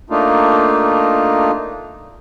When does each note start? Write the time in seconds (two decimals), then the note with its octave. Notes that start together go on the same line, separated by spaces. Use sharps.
0.10 A3 A#3 D4 D#4 F4